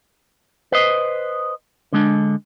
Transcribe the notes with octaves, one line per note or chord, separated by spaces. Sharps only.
B4 C5 D#5
D3 G#3 D4